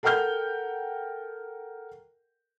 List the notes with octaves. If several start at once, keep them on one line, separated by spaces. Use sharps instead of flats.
A4 A#4 F#5 G5 F6 G6